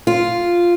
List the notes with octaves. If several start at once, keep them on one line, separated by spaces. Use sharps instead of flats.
F4